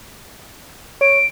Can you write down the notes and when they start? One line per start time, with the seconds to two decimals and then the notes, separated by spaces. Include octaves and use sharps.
1.01 C#5 D7